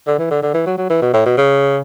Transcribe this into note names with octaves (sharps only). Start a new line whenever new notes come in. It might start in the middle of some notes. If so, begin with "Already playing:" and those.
D3
E3
D3
D3
E3
F#3
F#3
E3
B2
A2
B2
C#3